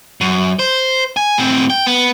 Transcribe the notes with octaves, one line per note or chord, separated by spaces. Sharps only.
F#2
C5
G#5
A2 C4
G5
B3